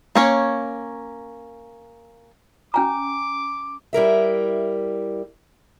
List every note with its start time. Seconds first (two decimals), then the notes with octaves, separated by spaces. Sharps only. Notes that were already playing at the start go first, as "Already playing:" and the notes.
0.15 A#3 C#4 C#5
2.74 C#4 G#5 A#5 D6
3.93 G3 E4 A#4 E5